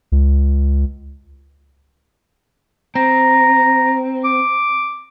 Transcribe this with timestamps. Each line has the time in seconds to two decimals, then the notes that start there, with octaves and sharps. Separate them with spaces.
0.12 C#2
2.95 C4 A#5
4.24 D6